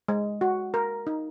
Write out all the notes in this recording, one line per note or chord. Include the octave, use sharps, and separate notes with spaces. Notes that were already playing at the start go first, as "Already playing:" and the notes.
G#3
F#4
A#4
D#4